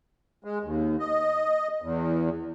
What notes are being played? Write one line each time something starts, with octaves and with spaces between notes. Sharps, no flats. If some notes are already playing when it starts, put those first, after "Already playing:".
G#3
D#2
D#5
E2